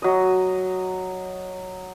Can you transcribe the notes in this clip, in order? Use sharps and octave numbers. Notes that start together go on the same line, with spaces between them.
F#3 D#5